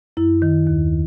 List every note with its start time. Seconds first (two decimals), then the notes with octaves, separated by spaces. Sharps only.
0.17 F#2 E4
0.42 D#3
0.67 D#2